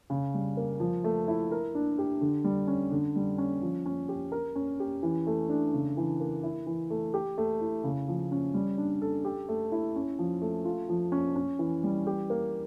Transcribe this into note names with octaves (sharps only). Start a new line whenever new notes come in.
C#3
G3
A#3
F3
A3
E4
A#4
D4
G4
D3
G3
C#4
D3
G3
C#4
F3
C#4
G4
A#4
C#4
G4
E3
A3
D4
C#3
E3
A#3
E4
E3
A3
G4
A3
E4
C#3
F3
C#4
G3
D4
A4
G4
A3
E4
C#4
F3
A3
F4
F3
C#4
C#4
E3
G3
G4
A#3